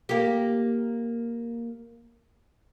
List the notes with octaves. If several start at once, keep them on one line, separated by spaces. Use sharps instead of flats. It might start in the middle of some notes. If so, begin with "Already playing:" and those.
A#3 G4